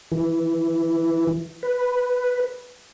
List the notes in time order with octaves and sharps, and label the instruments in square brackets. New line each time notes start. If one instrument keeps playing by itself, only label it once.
[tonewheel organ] E3
B4